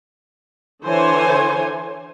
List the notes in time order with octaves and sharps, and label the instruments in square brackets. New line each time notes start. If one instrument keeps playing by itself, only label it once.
[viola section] D3 E3 C5 C#5 G#5